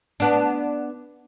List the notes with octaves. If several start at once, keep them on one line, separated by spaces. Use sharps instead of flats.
B3 D4